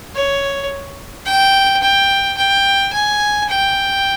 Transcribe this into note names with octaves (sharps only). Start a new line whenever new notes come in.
C#5
G5
G5
G5
G#5
G5